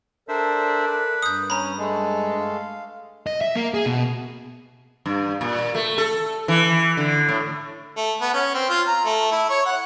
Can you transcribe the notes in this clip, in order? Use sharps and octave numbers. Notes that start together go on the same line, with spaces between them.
D4 A4 A#4 C5 D5 E5
B4
G2 D#6 G6
C#4 A#5 B5
G#3 A3
F5
D#5
E5
A#3
G#4
B2
G2
A#2
A3
A4
E3
D3
A2
A3
B3
C#4
C4
F4
A#5
A3
E4
C#5
F#5